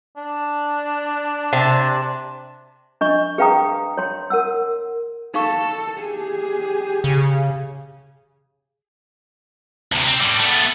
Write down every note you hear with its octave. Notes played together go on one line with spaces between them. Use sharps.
D4
C3 A5
D4 D#5 C#6
G#4 B4 F5 G5 A#5 D#6
C#5 C6
A#4 F#5 E6
D#4 A4 F5 C#6
G4 G#4
C#3
D2 C3
C4
A2 G3
A3 B3